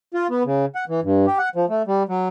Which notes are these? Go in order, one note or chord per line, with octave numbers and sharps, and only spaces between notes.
F4
B3
C#3
F#5
E3
G2
G4
F#5
F3
A3
G3
F#3